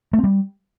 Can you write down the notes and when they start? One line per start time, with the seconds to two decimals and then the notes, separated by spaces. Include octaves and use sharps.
0.13 A3
0.18 C4
0.24 G3